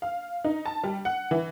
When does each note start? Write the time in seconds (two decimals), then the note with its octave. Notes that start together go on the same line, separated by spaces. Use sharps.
0.02 F5
0.44 D#4
0.66 A5
0.84 G3
1.05 F#5
1.31 E3